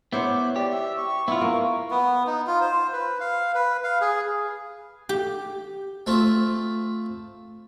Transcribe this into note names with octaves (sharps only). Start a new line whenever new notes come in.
B3 E4 C5 C#5 D6
G4 D5
E5
C#6
B3 E4 F4
A#3
B3
D#4
F4
C5
B4
F5
B4
F5
G#4
G4
A3 C4 F4